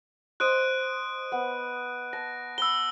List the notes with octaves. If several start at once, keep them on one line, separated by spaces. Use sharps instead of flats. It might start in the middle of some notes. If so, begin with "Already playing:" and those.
C5 D#5 F#6 D7 D#7
B3
A5 A#6
B5 E6 G7